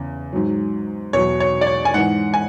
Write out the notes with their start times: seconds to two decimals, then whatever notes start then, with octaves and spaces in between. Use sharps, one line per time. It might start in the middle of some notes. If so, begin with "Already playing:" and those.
Already playing: E2 C#3
0.33 G#2 F#3
1.13 E2 B2 F#3 C#5
1.40 C#5
1.61 D5
1.67 C#5
1.85 G#5
1.94 G#2 E3 F#5
2.34 G#5